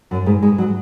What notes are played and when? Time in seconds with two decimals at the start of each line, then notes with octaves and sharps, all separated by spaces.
0.11 F#2 F#3
0.26 G#2 G#3
0.42 G#2 G#3
0.58 F#3